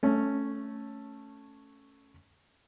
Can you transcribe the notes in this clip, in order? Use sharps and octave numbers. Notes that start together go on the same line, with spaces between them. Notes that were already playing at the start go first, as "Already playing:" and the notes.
A3 C#4